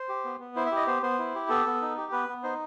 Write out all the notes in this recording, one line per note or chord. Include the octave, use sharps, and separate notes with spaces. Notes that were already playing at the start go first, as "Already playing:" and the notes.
Already playing: C5
G4
B3
B3
E4 C5
E5
G4 D#5
B3 C5
B3 C5
E4
G4
B3 A4
B3
D#4
G4
B3 B4
B3
D#4 C5